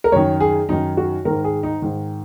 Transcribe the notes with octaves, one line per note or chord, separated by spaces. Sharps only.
A#4
F#2 D#3 C#5
G#4
F#2 D#3 D#4
F#4
G#2 D#3 A#4
G#4
D#4
G#2 D#3